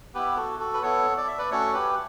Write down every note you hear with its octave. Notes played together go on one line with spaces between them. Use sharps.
B3 E4 G4 B4
F#4 A4
F#4 A4
B4
B3 E4 A4 C#5
D5
E5
B4 D5
A3 C#4 F#4 A4 C#5
G4 B4